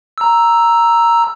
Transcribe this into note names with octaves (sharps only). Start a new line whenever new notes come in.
A#5 E6